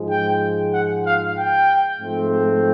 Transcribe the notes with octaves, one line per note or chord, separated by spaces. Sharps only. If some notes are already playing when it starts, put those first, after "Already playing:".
Already playing: G#2 F3 G#3
G5
F#5
F5
G5
G#2 F3 A3 C4